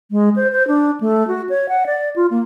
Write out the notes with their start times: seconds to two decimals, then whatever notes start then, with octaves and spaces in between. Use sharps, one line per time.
0.11 G#3
0.36 C5
0.52 C5
0.68 D4
1.01 A3
1.28 F#4
1.49 C#5
1.69 F#5
1.86 D5
2.16 F4
2.31 A#3